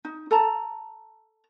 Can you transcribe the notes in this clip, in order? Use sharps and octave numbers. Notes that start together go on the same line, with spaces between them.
D#4
A4 A5 A#5